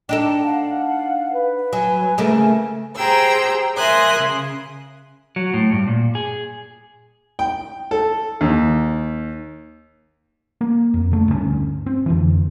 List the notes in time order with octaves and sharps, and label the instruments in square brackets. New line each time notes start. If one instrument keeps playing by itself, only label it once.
[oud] D4 D#4 A4 [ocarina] G5
[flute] F5 [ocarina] F#5
[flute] B4
[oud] F#3 [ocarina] G#5
[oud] C#3 A3 A#3 [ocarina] G#5
[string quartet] G4 G#4 C5 G5 A#5 E6
A#4 E5 G#5 C6 D#6 F#6
C#3
[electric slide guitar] F#3
A2
G2
A#2
G#4
[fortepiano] G5
A4
D#2
[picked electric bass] A#3
F2
C#3 A3
D2 G2 G#3 C#4
C4
F2 D3 E3